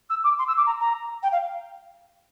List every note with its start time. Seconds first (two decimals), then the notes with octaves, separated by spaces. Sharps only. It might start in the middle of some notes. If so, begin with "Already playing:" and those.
0.09 E6
0.24 D6
0.38 C6
0.47 E6
0.57 D6
0.66 A#5
0.80 A#5
1.22 G5
1.32 F5